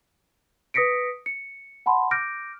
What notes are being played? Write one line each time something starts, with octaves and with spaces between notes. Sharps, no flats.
B4 D#6 A#6 B6 C#7 D7
C#7
F#5 A5 B5 C6
D6 F6 G6 A#6 D7